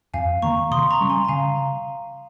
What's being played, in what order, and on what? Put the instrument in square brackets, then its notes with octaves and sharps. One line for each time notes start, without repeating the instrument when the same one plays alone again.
[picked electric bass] F2 [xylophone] F5 G#5
[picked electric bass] D#3 A#3 [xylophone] A#5 C#6
[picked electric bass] C3 [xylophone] C6 D#6
[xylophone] A#5 C#6
[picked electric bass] G3 C#4
[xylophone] G#5 C6
A#5
[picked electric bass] C#3 [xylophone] F5 G#5